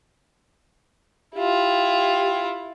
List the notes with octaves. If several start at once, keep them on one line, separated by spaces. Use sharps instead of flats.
E4 F4 G4